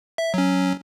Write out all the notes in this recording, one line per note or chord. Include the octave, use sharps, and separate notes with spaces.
E5
F#3 C#4